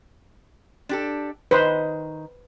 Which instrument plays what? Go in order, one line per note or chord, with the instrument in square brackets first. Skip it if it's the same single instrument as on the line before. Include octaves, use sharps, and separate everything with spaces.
[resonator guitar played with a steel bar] D4 G4 A4
[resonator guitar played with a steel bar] D#3 D#5 [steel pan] B4 C5